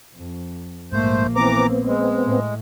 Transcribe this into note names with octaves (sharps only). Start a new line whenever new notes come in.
F2
A#1 G#2 A3 A#3 C5
E3 B3 C4 A#5 D6
G#3
A2